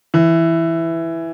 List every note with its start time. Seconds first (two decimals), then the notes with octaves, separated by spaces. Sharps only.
0.14 E3